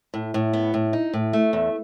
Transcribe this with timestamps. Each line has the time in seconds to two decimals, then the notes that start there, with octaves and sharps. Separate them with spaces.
0.14 A2
0.34 A2
0.53 B3
0.74 A2
0.93 D#4
1.14 A2
1.33 A3
1.53 E2